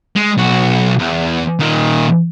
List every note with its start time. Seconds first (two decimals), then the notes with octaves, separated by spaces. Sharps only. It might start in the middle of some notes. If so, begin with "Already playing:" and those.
0.16 G#3
0.37 B1 F#4
0.99 E2
1.59 A#2 D#3